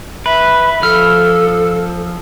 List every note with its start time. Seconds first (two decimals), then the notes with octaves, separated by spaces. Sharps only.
0.26 B4 E5
0.83 F3 A4 F6